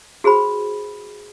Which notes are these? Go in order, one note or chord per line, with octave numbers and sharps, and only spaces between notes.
F#4 G#4 B4 C5 B5